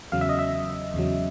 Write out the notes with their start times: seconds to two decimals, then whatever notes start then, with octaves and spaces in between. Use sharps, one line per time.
0.12 E2 C#3 F#3 F5
0.21 E5
0.29 D#5
0.39 E5
0.94 E2 C#3 F#3